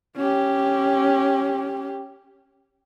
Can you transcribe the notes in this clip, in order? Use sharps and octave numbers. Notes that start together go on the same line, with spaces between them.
C#4 G4